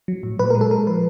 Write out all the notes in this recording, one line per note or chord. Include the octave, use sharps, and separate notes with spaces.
F#3
A2
A#2 B4
A#4
G#3
A4
G#3 A#4
F3 B4